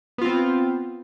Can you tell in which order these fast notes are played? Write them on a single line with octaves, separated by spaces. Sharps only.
B3 F4 C4